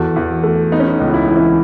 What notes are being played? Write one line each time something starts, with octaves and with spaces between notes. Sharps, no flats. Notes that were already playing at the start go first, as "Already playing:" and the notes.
Already playing: E2 F#4 A4
E2
A3
B3 D#4
C#4
D#4
C#2
E4
E3 D#4
C#4 E4